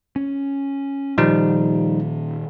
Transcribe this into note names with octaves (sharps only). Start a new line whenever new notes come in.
C#4
A#2 D#3 F3 G3 D#4